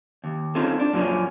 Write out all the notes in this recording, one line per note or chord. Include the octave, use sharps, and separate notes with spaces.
D#2
C4 C#4 D#4 F4 A4
D4
F#2 A#2 D3 F3 C#4